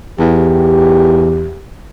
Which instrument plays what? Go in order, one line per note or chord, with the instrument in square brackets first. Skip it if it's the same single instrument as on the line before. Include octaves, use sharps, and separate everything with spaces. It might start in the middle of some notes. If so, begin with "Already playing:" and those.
[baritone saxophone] E2 [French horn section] G4